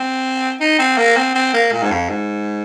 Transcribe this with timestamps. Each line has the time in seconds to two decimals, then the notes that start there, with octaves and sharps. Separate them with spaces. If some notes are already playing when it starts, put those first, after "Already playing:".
Already playing: C4
0.60 D#4
0.79 C4
0.98 A#3
1.17 C4
1.35 C4
1.54 A#3
1.72 A#2
1.83 G#2
1.91 F2
2.09 G#2